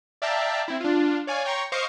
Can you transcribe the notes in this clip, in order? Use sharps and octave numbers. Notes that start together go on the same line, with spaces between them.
D5 E5 F5 G5 A5 A#5
C4 E4
D4 F4
C#5 D5 F5 G#5
C#5 G5 A#5 C6 C#6
C5 D#5 F5 C#6 D6 C7